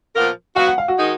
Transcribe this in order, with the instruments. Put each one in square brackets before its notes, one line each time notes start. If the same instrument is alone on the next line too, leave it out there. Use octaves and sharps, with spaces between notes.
[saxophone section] A#2 F3 B3 F4 A#4
[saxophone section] F#3 B3 F#4 [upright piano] F5
[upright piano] F#5
F5
F#4
[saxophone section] D#3 G#3 D#4